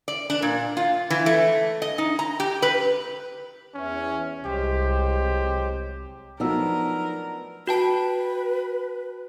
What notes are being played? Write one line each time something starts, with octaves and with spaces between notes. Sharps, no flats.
D5
D4
A#2
F4
E3
A3
D#5
D#4
A#5
G4
B4
E2 E3 C#4
C2 F#3 G#3 G4 C5
F3 F#3 A3 B3 D4 D#4 A#4 E6
F#4 B4 G5 A5